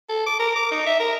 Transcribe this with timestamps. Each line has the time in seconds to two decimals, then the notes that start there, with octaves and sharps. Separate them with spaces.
0.09 A4
0.26 D6
0.40 A#4
0.56 D6
0.71 D#4
0.86 E5
1.00 A#4